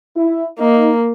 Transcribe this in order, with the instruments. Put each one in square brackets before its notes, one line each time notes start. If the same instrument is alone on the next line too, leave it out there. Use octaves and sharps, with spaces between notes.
[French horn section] E4
[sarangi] A#3 [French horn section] D#4